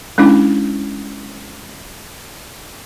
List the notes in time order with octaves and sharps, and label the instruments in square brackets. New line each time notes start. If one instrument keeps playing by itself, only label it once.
[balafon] G#3 C#4 D4 E4